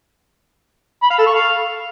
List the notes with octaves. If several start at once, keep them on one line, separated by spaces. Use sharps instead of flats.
B5
F5
A4
C#6
F5